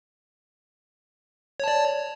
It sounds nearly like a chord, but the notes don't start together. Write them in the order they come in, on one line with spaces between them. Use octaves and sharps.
C#5 A5 D5